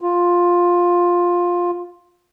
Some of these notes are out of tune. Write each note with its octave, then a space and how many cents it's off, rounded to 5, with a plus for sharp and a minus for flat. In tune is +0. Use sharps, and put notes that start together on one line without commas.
F4 +10